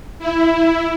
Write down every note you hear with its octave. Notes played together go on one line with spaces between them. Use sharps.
E4